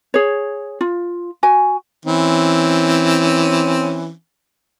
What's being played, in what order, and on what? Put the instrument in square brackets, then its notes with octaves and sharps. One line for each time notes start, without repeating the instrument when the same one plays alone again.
[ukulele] G#4 C#5
F4
F#4 G#5
[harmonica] E3 C4 C#4